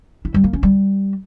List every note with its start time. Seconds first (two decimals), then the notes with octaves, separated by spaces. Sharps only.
0.25 E4
0.34 G3
0.44 A#3
0.53 C#4
0.63 G3